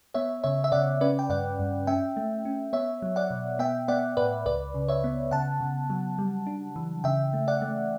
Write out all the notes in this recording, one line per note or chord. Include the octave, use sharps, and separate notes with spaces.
B3 C#5 E5
C#3 C#5 E5
E5
C#3 D5 F#5
C#4 B4 D5
G5
G2 D5 F#5
G2
C#4 E5 G5
A3
C#4
B3 C#5 E5
F#3
D5 F#5
B2
B3 E5 G5
B3 D5 F#5
A2 B4 D5
C#2 B4 D5
C#3
C#5 E5
B3
C#3 F#5 A5
C#3
F#3
G3
D4
E3
C#3 E5 G5
A3
D5 F#5
A3